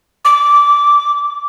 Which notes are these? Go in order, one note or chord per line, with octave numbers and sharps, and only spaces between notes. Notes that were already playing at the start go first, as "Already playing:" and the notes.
D6